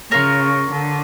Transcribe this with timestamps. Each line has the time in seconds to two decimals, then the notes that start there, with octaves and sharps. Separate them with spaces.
0.11 C#3 F4 A#4 C#5
0.71 D3